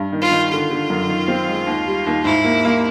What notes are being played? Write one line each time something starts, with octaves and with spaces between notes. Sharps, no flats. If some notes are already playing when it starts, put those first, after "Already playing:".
Already playing: G2
D#3
F4
D#3
D3 F4
D3
F#2
D#3
C4
G#3
D#2
G3
D#2
G#2 E4
A#3
A#3